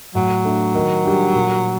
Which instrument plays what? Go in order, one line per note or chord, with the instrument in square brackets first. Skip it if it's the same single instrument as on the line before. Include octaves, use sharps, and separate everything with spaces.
[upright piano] A2 [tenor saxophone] F#3
[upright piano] A3 D4
D#3
G3 D4 G4
A#2